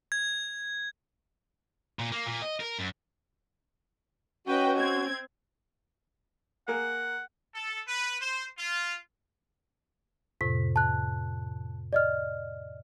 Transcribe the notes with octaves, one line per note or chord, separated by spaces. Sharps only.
G#6
A#2
A#3
A#2
D#5
A#4
F#2
C#4 F#4 B4 D#5 G5
C4 G#6
A#3 G#4 A#4 F#5
A4
B4
C5
F4
F2 A2 C3 B6
A5 F#6
D5 D#5 F6